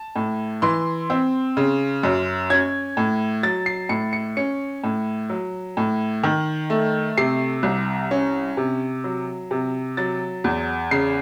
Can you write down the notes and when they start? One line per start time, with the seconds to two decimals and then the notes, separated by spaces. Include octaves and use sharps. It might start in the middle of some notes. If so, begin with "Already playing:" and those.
Already playing: A5
0.16 A2
0.62 E3 C6
1.10 C4
1.57 C#3
2.03 F#2
2.50 C#4 G#6
2.97 A2
3.43 F#3 A6
3.66 C7
3.89 A2 C#7
4.13 C#7
4.37 C#4 C#7
4.83 A2
5.30 F#3
5.77 A2
6.24 D#3
6.70 A3
7.18 C3 C7
7.63 C2
8.11 C#4
8.57 C3
9.04 F#3
9.51 C3
9.97 F#3 A6
10.44 E2
10.91 C#3 C7